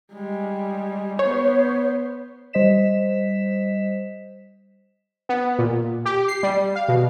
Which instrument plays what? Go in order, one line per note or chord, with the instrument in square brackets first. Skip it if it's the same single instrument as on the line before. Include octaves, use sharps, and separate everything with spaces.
[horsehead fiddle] G3 G#3
[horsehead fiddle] B3 C5 [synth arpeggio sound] C#5
[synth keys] G3 C5 D#5 B6 E7
[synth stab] B3
A#2
G4
C7
G3
F5
B2